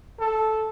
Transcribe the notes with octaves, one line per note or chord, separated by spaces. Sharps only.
A4